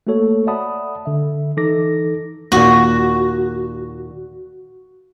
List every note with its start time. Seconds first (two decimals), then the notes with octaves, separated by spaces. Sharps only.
0.07 A3 A#3 F#4 A4 C#5
0.47 D5 E5 F#5 A5 B5 D#6
1.05 D3 E5
1.57 E3 D#4 A4 D6 A#6
2.52 D#2 A#2 F#4